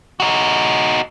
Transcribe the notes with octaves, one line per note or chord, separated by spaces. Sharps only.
D#4 F#4